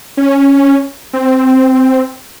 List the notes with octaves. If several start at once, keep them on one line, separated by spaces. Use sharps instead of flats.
C#4
C4